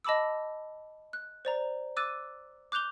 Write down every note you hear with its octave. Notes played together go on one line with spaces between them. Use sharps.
D#5 A5 B5 D6 E6
F#6
C5 D5 A#5
D6 E6 F#6 A6 D#7
D6 F#6 G6 F7 G7